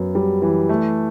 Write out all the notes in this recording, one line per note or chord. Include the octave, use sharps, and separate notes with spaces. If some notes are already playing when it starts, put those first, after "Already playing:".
Already playing: F#2 B3
G3
E3
A3